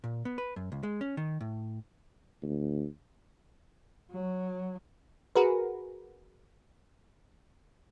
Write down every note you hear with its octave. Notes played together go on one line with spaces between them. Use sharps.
A#2
B3
B4
F#2
C#2
G#3
C#4
D#3
A2
D2
F#3
F#4 G#4 A#4 B4